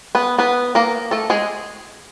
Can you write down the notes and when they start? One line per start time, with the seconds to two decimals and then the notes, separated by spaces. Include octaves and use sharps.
0.15 B3 B4
0.39 B3 B4
0.75 A#3 A#4
1.11 A3 A4
1.30 G#3 G#4